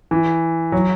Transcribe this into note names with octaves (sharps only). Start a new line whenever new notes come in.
E3
F#3